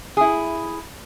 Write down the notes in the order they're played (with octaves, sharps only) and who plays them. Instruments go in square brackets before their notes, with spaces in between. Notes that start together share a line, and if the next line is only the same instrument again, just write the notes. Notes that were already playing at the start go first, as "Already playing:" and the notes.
[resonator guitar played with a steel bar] E4 G#4